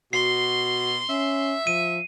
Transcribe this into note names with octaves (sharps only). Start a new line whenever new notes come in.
B2 F#4 C6 C7
C#4 E5
F3 D#7